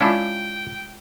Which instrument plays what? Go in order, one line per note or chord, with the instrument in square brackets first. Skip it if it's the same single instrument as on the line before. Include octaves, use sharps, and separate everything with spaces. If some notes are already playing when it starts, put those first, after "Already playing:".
[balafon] G#3 F4 [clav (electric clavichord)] C#4 D4 E4 [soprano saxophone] G5